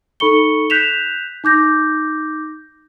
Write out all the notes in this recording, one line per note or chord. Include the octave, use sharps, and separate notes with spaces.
D#4 A4 B5 C#6 C#7 G7
F#6 G6 B6 E7 F7
D#4 D6 G6 A#6